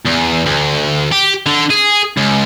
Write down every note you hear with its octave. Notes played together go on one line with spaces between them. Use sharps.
E2
D2
G4
D3
G#4
C#2